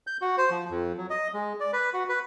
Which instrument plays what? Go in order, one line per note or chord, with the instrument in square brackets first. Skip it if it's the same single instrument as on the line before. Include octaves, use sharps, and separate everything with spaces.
[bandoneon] G6
F#4
C5
F3
F2
F#3
D#5
G#3
D5
B4
F#4
B4